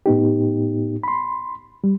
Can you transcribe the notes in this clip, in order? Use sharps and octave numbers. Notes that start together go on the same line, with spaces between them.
A2 B3 D#4 G4
B5 C6
G3